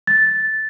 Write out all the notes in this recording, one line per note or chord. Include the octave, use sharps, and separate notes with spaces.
A6